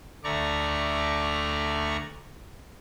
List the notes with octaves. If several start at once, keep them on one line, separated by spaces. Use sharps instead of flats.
D2 A3 D5 A#5 C#6